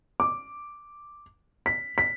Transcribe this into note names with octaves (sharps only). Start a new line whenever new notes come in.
D6
B6
B6